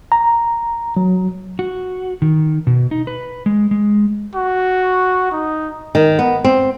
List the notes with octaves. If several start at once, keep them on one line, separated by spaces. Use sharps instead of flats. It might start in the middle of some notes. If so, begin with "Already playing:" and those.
A#5
F#3
F#4
D#3
B2
D#4
B4
G#3
G#3
F#4
D#4
D#3
B3
C4